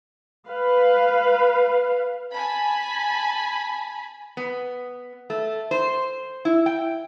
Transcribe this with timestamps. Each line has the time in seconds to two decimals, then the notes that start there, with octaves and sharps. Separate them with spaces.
0.47 B4 F5
2.32 G#5 A5 B5
4.37 B3
5.30 A3
5.71 C5
6.45 E4
6.66 G5